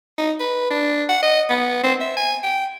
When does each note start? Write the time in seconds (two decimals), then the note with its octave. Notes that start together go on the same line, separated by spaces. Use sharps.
0.18 D#4
0.40 B4
0.71 D4
1.09 F#5
1.23 D#5
1.50 B3
1.84 C4
2.01 E5
2.17 G#5
2.43 G5